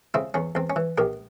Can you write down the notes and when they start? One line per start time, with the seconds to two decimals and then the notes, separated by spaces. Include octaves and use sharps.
0.14 C#3 C4 E4
0.34 E2 C#4
0.55 E2 C4
0.70 C#4
0.76 E3
0.98 A#1 G4 A#4